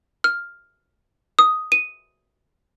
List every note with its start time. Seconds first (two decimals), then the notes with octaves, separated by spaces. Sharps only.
0.24 F6
1.39 D#6
1.72 D#7